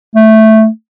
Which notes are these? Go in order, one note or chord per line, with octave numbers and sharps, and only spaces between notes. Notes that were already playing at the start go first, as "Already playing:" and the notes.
A3